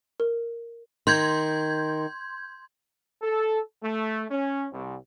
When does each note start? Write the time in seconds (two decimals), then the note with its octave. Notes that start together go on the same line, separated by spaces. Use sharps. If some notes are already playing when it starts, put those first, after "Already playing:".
0.20 A#4
1.07 D#3 C6 G6 G#6
3.22 A4
3.82 A3
4.30 C#4
4.72 C2